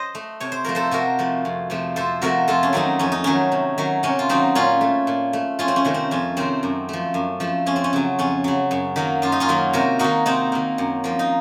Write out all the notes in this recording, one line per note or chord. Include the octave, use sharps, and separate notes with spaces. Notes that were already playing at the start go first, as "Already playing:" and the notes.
Already playing: C5 D#5
A3
C3 C#5
C5
F3 A3 A#4
A4 C5
C3 F#4 A#4
F3 A3
F2
C3 F3 A3
F2 A4 C5
C3 F3 A3 F#4 A#4
F2 F4 A4
C#4
D#3 F#3 A3 C4 D#4
F2 C#4
D#4
D#3 F#3 A3 C#4
C3
D#3 F#3
C3 C#4
F4
D#3 F#3 C4 D#4
A#2 C#4 F4
A3
A#2
A3
F2 C#4 F4
C4
C#4
C3 D#3 A3
C4
F2 C#4
C3 D#3 A3 C4
F#2
F3 A3
F#2
F3 A3
F2 C#4
C4
C#4
C#3 F#3
F2 C#4
C#3 F#3
F#2
D#3 F#3 A#3
F#2 F4
D#4
C#4 F4
D#3 F#3 A#3
C3 F#4 A#4
D#3 A#3 D#4 F#4
C3 C4 D#4
D#3 A#3
F#2
F3 A#3
D#4